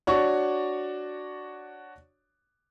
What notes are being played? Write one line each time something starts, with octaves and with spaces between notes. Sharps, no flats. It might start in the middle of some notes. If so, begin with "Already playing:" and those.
D4 F#4 C#5 D5 C#6